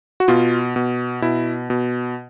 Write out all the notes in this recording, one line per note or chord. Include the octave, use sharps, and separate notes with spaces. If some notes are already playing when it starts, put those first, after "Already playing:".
F#4
B2 F4
B2
B2 E4
B2